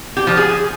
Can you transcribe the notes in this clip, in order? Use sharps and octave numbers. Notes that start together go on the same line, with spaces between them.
G4
F3
G#4